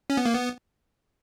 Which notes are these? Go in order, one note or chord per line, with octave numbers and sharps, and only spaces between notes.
C#4
B3
A#3
B3